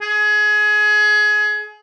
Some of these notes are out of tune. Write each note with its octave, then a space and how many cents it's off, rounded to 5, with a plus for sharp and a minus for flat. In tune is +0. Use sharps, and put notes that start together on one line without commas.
G#4 +25